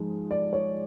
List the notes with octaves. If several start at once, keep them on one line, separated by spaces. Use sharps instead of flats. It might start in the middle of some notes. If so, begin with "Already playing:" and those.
Already playing: G#2 F3 G#3
D5
C#5